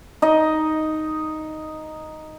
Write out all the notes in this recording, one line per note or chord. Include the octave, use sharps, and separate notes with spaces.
D#4 D#5